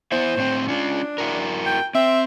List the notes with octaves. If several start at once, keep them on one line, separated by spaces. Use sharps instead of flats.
B3 E4 C5 E5
A2 C4
C#4 D4 F4
E4 F#4 A#4
G5
C4 E5